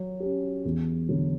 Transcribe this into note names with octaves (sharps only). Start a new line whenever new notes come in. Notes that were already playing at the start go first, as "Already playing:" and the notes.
Already playing: F#3
C#4 G4
E2
D3 F#3